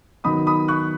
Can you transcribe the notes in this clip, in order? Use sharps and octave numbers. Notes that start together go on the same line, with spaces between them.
D#3 F#3 B3 D#4 B5 D#6
B5 D#6
C#6 F#6